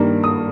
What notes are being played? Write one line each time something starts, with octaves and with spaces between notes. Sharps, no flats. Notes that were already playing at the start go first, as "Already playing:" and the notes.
Already playing: G2 D#3 G3 A#3
D#6